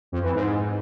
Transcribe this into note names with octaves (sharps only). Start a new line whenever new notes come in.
F2
E3
G#2